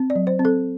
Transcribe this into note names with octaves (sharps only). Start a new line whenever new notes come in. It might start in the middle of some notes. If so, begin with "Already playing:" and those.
Already playing: C4
D5
F#3
C5
C4
A4